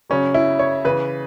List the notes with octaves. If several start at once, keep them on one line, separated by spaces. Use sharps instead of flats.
C#3 F#3 C#4
E4
C#5
C#3 E3 B4